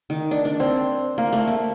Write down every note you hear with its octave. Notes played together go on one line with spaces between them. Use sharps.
D#3
D4
D4
C4
A#3
A3
A#3